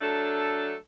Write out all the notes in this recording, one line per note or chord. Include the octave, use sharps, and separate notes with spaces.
F#3 A3 D4 A4